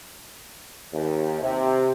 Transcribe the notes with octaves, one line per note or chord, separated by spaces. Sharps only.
D#2
C3